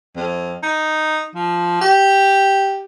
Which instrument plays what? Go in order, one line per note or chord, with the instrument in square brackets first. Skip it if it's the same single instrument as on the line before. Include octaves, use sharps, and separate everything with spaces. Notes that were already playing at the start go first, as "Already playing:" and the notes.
[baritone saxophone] F2
D#4
F3
G4